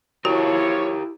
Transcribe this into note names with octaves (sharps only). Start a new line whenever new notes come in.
F3 E4 F#4 G4 A#4 C#5